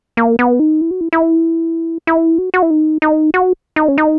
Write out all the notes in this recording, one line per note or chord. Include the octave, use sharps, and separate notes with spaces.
A#3
B3
D#4
E4
F#4
E4
E4
E4
F#4
F#4
E4
D#4
D#4
F#4
D#4
C#4
D#4